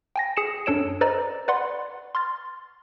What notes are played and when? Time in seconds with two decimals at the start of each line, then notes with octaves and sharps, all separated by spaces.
0.16 G5 G#5 A#6
0.37 G#4 G#5 C#7 E7
0.66 F#2 D4 A4 C#5 D7 E7
1.01 A4 B4 C5 D5 D#5 A#5
1.48 B4 D5 F#5 B5 C6
2.15 C6 F6 A6